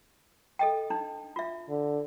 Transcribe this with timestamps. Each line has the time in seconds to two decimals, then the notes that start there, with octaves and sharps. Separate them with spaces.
0.59 A4 D#5 G5
0.90 D4 D#4
1.36 F4 E5
1.69 D3